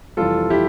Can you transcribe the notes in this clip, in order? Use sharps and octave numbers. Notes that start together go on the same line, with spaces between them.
F1 F2 E3 G3 F4 A4
E4 G4